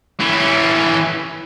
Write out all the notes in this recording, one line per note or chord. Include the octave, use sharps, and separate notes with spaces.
E3 C#4